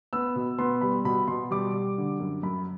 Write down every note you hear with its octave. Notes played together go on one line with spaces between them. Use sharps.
B3 E6
B2
B3 C6
G3 B5
B2 B5
B2 C6
G3 D6
G3
D3
F#2
F#2 B5